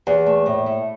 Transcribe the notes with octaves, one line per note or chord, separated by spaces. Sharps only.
E2
A3
A2
A3